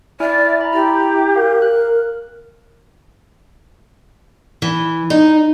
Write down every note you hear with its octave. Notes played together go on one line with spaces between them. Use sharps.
E4 D5 E5 G#5 F6
A#5 B5
E4 G4 A#5
A#4 F5
F#6
E3
D#4